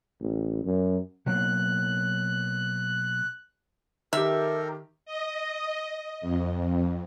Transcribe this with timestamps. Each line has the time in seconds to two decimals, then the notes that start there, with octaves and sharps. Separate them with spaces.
0.21 A1
0.65 F#2
1.26 B2 F#3 A#3 F#6
4.13 D#3 G4 A4 A#4 E5
5.06 D#5
6.21 F2